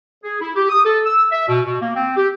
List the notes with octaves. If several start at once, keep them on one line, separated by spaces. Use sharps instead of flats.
G#4
E4
G4
D#6
A4
E6
E5
B2
B2
A#3
C4
G4